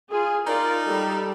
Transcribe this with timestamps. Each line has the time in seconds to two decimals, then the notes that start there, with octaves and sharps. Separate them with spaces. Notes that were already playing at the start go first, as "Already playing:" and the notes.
0.11 F4 G#4
0.47 D#4 F4 A#4 D5
0.85 G3 A4